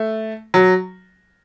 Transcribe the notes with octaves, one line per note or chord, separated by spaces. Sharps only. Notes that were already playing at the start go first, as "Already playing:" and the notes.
Already playing: A3
F#3